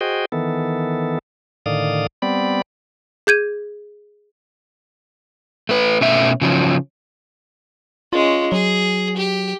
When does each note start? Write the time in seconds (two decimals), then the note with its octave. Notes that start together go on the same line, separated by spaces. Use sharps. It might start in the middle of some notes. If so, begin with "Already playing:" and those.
0.01 F#4 G#4 C5 D#5 G5
0.32 D#3 E3 B3 A4
1.66 A2 D3 D#3 D5 F5 D#6
2.22 G3 B3 C4 D5 B5
3.27 G#4 G6 G#6 D#7
5.69 A3 B4
6.01 B2 A3 C#4 A4 E5
6.42 C#3 F3 F#3
8.13 G#3 C#4 F4
8.52 F#3 G#4
9.17 G4